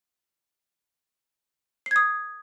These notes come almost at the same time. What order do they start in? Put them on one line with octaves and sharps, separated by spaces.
C7 G#6 D#6